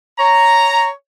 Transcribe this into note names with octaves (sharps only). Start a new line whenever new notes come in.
C#5 A#5